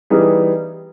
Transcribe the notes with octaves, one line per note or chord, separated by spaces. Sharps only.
E3 G3 B3 D#4 G#4